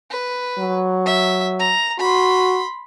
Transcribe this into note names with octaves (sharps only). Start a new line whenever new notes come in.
B4
F#3
E5
A#5
F#4 B5 C6